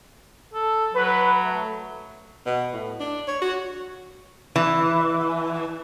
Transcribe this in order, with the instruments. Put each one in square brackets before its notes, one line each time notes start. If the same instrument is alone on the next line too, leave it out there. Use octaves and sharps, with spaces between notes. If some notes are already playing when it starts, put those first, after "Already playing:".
[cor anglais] A4
[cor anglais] F#3 [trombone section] B4
[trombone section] A3
[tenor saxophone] B2
A2
D4
C#5
F#4
[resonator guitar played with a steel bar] E3